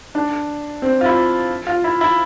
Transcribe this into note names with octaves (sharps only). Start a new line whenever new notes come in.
D4
C4
F4
E4
F4
E4
E4